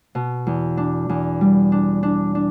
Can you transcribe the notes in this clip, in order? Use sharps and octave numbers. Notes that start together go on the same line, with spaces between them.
B2
E2
D4
E2
G3
D4
D4
D4